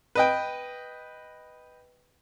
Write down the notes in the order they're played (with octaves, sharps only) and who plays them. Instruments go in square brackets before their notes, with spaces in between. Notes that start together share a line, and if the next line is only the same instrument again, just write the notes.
[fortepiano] B4 D#5 G5